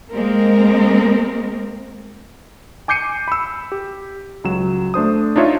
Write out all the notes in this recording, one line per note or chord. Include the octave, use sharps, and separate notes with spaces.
G#3 A#3 C4 A#4
G#5 D6 G6 C7 C#7 D#7
B5 E6
G4
C#2 F#3 E7
A3 D4 C5 D#6
D4 D#4 F4 C#5 E5